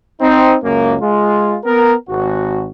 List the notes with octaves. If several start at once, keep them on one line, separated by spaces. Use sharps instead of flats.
C4 D#4
C#2 F#2 A#3
G#3 F4
B3 A#4
G#1 F#4